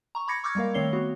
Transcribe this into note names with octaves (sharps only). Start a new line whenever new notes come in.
A#5 C#6
B5 D6 G#6 A#6 C#7
C#6 D6 E6 F6 G6 G#6
G3 G#3 A#3 A#4 F5
D#3 A3 C4 C#5 C7 G7
B3 F#4